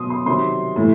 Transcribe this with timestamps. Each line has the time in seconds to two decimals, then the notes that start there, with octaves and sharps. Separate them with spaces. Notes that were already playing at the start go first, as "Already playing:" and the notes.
Already playing: B2 F#3 C6 D#6
0.10 C6
0.26 C3 D#3 F#3 C6
0.76 A2 E3